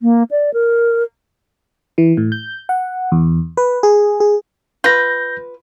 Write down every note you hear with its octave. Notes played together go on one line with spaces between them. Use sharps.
A#3
D5
A#4
E3
A2
G6
F#5
E2
B4
G#4
G#4
F4 B4 G6 A#6